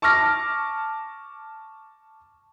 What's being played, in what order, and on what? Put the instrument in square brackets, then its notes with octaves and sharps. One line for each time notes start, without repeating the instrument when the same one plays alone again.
[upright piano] A5 C#6 D6 F6 A#6